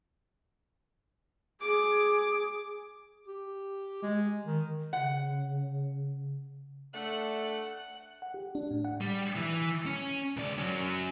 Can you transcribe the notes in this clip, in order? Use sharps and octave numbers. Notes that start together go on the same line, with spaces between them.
G#4 D6
G4
G#3
D#3
C#3 F#5
A3 D4 F#5 F#6
F#5
G4
D4
A2
F#5
G3
E3
C#4
C#2 D5
F#3 C#4